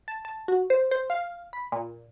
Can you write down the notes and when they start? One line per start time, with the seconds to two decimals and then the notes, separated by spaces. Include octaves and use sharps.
0.08 A5
0.25 A5
0.48 F#4
0.70 C5
0.91 C5
1.10 F5
1.53 B5
1.72 A#2